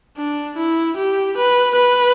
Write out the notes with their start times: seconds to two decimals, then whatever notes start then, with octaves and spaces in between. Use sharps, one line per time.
0.18 D4
0.57 E4
0.97 G4
1.37 B4
1.76 B4